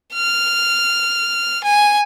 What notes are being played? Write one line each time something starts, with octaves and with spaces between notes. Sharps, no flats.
F6
G#5